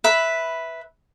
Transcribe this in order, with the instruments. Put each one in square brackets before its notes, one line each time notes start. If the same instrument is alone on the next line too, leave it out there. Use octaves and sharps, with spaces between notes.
[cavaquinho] B4 E5 B5